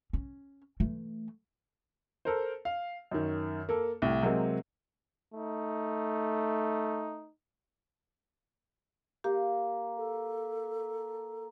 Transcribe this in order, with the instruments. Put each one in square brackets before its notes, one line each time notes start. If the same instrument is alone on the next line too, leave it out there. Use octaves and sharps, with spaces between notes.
[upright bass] C#4
E3 A3
[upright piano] A4 A#4 C5
F5
F#2 D#3
A#3 A4
C2 A2
C3 F#3 G#3 A#3 C4
[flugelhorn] A3 [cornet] D#4
[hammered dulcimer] A#3 [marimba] G4
[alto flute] A4